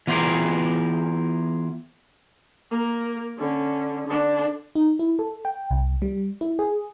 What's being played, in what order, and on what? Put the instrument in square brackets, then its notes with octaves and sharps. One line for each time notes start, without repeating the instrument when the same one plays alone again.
[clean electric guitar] E3 B3 F4 G4 G#4 A#4
[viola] A#3 A#4
D3 C#4
D3 D4
[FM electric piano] D#4
E4
A4
G5
C2
G3
E4
G#4